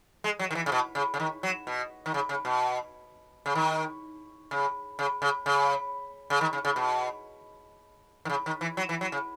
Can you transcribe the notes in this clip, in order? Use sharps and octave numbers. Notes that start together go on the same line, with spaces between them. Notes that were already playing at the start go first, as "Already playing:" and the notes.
G#3
F#3
D#3
E3
C#3
B2
C#3
C#3
D#3
F#3
B2
D#3
C#3
C#3
B2
C#3
D#3
C#3
C#3
C#3
C#3
C#3
D#3
C#3
C#3
B2
D#3
C#3
D#3
E3
F#3
E3
F#3
C#3